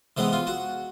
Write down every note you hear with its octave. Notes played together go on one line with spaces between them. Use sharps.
C3 E3 G#3 B3 B4
F4
F#4